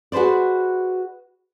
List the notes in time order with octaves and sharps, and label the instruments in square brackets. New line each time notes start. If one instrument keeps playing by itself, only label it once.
[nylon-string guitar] F#4 G#4 B4 C5 D5